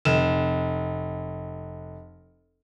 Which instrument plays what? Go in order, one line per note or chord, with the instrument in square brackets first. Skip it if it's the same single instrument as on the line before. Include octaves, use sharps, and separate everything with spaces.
[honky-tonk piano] F1 E7